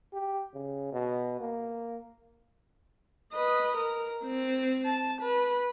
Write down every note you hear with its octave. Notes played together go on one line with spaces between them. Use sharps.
G4
C#3
B2
A#3
B4 D#5
A#4
C4
A5
B4